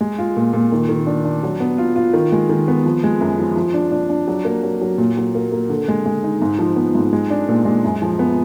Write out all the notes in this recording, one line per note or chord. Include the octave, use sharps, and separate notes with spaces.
G#3
F4
A#2
A#2
D#3
D#3
D4
D4
F#3
B3
F4
F4
D#3
G#3
D#3
B3
F3
G#3
F#2
F3
F3
D4
D4
D4
F#3
A#3
F#3
F#3
A#2
F#3
A#3
A#3
D3
G#3
G#3
D#4
G#2
F3
B3
G#2
G#3
D4
A#2
G#3
F#2
F3
B3